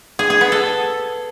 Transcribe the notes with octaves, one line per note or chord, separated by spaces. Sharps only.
G#4
G#4
B3
A4